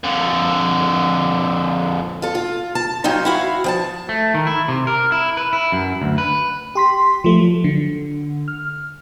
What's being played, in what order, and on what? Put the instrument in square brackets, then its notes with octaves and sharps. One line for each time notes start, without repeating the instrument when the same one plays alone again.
[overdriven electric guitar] F2 D3
[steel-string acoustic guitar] F4 A4
F4
A5
F#3 C4 C#4 D#4 F4
E4 F#4 F5
F3 G5 A5
[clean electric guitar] A3
D#3
E4
C3
A#4
E4
B4
E4
F#2
D2
B4
[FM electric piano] G4 C6 B6
F3 A3
F#3
D3
F6